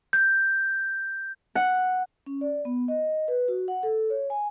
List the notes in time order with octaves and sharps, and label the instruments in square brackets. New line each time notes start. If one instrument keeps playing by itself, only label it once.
[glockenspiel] G6
[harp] F#5
[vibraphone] C#4
D5
B3
D#5
B4
F#4
F#5
A4
C#5
G#5